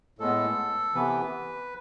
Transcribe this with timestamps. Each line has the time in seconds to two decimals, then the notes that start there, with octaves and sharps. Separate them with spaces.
0.19 A2 G#3 B3 A4
0.94 C3 E3 B3 B4